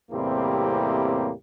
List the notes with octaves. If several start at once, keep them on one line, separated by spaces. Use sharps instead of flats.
E2 A2 C3 G3 A#3 C4